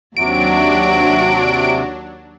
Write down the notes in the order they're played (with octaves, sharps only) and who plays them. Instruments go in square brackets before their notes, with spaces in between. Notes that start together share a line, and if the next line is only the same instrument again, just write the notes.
[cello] D#2 F#4 [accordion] C3 [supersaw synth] F#3 D4 [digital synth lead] D7